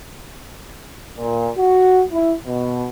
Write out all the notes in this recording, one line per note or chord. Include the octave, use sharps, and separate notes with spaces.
A#2
F#4
E4
B2